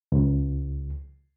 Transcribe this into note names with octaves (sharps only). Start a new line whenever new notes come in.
C#2